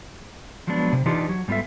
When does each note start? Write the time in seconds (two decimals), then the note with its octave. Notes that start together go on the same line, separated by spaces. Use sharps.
0.67 F3 F#3 G#3 B3 D4
0.93 C3
1.06 E3 D4 D#4 F4 G4
1.29 F#3
1.48 G#2 G3 B3 F4 A4 E5